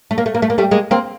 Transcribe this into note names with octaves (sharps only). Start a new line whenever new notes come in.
A3
A#3
A3
A#3
A3
A#3
G3 A3
G#3 A#3
A#3 C4